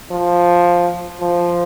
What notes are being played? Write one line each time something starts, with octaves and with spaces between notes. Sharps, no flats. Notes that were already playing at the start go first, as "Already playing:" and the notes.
F3
F3